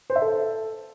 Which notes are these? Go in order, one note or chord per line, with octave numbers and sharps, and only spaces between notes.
C5
E5
A4